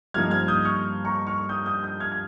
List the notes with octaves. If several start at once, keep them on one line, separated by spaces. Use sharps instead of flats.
G2 F3 A#3 D#4 F6 G#6
F6 G#6
D#6 G6
C#6 F6
A#5 C#6
C#6 F6
D#6 G6
D#6 G6
D#6 G6
F6 G#6
G#6